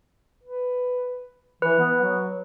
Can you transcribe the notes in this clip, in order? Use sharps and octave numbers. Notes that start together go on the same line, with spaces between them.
B4
E3 B4
B3
F#3